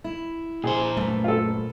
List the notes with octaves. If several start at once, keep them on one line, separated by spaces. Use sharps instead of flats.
E4
A#2 G#4 C5
F#2 A3 B4
F4 A4